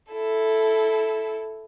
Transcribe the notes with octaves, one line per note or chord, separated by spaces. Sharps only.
E4 A4